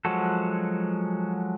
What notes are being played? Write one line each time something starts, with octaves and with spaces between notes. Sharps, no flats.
F3 F#3 G#3 F#4 A4